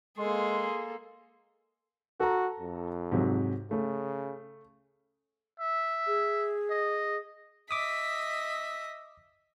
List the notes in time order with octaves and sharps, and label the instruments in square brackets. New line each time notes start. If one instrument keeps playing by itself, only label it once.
[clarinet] G#3 [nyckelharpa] A#3 A4 [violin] G#4 [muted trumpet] C6
[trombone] F#4 [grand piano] A4 A#5
[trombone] F2
[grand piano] G#2 C3 F#3
[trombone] C#3 [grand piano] A3
[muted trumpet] E5
[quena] G#4
[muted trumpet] D#5
[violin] D#5 B6 [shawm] E5 [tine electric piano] D6 D#6